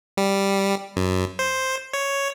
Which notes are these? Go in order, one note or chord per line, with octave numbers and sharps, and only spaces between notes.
G3
F#2
C5
C#5